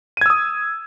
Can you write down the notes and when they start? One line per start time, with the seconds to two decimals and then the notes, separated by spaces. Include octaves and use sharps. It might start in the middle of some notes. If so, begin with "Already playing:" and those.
0.17 D#7
0.21 G#6
0.26 E6
0.30 D#6